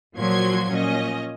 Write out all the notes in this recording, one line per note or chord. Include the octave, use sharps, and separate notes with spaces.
A#2 F3 F#3 F#4 C6 G#6
A#2 C#4 D#5